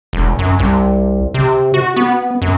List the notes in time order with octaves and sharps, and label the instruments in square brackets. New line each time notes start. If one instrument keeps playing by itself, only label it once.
[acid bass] E1
F#2
C2
C3
F#4
B3
F#2